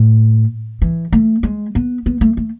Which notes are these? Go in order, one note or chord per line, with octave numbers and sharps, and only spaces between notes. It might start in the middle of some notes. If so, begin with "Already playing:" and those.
Already playing: A2
E3
A3
G#3
B3
B3
A3
A3